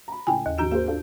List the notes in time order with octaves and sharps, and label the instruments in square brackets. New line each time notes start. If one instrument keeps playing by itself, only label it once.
[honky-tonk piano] A#5 B5
[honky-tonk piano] C#2 A2 [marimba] G5 G#5
[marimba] D#2
[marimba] G#2 F#4 A#5 [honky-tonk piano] D#3 G6 D7
[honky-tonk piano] A#3 G#4 C5 [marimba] F#4
[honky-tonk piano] D4 F4 A4